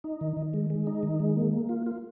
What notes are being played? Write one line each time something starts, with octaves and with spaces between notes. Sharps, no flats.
D#4
D#3
D#3
G#3
G#3
D#4
D#3
G#3
A#3
A#3
F4
F4